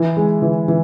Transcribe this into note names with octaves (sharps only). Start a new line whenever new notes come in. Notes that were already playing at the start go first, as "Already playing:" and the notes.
Already playing: E3
G#3
E3
E3